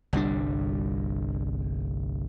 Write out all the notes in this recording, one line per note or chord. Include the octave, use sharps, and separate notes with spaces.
G1 C2 G3 D4